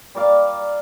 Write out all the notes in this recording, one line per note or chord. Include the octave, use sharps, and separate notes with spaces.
G3 A#4 D5 F5